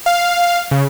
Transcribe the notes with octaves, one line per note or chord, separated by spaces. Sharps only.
F5
C#3